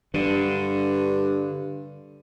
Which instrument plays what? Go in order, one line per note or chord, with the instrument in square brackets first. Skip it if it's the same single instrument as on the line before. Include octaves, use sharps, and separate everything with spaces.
[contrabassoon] G2 [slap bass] D3